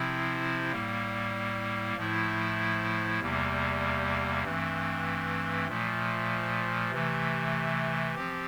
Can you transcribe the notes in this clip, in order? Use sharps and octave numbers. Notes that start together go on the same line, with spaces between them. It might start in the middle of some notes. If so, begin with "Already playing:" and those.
Already playing: C3 F3 C4 E4
A2 G3 A#3
A2 F3 A3 E4
E2 C3 G3 A#3
G2 E3 A3 C4
A#2 F3 A3
C3 E3 A3
F3 C4 G4